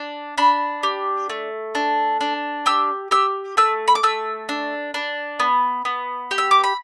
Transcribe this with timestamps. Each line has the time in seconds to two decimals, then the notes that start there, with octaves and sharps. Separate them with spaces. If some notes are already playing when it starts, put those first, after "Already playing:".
Already playing: D4
0.38 D4 B5
0.83 G4
1.30 A3
1.75 D4
2.21 D4
2.66 G4 E6
3.11 G4 E6
3.57 A3 E6
3.88 B5
3.95 D6
4.03 A3 E6
4.49 D4
4.94 D4
5.40 B3
5.85 B3
6.31 G4
6.38 E6
6.51 D6
6.64 B5